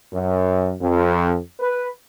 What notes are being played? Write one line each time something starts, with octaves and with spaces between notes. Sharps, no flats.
F#2
F2
B4